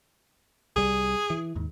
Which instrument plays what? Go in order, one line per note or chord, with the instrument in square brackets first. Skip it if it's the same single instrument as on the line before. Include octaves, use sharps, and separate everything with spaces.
[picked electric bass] C2 G3 [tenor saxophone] G#4
[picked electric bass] E3
D#2 G#2